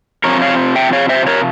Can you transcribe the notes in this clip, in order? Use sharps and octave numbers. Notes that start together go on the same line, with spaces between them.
C3 F3 C4 A#4 C#5
C#5 F5
E5 G5
C#5 F5
C5 E5
A#4 C#5